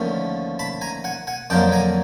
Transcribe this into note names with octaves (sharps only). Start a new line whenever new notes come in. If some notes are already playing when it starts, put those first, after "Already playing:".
Already playing: D#2 D3 F3 A3 C#4
A5 B5
G#5 A#5
F#5 G#5
F#5 G#5
F2 D3 F#3 A#3 G5 A5
G#5 A#5